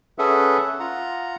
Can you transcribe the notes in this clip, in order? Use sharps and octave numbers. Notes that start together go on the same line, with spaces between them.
C#4 G#4 A4 B4 E5 F#5
F4 F#5 A#5